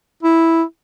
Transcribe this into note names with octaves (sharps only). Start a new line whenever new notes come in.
E4